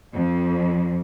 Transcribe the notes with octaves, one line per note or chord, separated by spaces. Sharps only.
F2